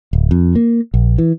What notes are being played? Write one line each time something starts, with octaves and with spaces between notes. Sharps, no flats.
D1
F2
A#3
A#1
E3